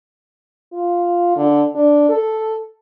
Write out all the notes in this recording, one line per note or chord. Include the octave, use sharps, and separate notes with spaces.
F4
D3
D4
A4